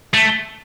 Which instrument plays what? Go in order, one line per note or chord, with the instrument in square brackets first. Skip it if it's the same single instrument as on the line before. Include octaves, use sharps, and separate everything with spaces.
[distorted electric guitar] A3